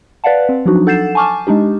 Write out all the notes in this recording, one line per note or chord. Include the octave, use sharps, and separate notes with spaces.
B4 D5 F5 F#5 A5
C4
F3 F#3 D4 D#4 F#4
A4 F#5 G6 A6 C7 E7
G#5 A5 C#6 D6 F6
G#3 D4 D#4 G4